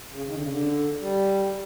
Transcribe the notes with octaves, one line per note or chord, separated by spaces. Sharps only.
C#3
D#3
D3
C#3
D3
G3